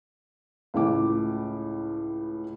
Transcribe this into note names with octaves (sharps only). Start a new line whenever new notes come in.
C#2 A2 D6